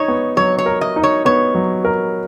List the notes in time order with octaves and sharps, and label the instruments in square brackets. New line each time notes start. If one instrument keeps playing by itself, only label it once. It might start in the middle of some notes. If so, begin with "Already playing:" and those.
Already playing: [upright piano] D#4 [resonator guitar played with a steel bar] C#5
[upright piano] B3
[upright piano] F#3 [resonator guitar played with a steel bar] C#5
[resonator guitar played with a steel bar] C#5
[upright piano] A#4
[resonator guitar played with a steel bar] D#5
[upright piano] D#4
[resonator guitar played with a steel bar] C#5
[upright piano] B3 [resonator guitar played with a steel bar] C#5
[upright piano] F#3
A#4